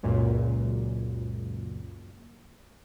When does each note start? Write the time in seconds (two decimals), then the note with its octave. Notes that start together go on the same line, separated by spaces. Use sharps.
0.03 C#2 F#2 A#2